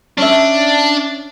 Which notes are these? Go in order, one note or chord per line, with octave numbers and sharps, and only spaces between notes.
C#4 D4 E5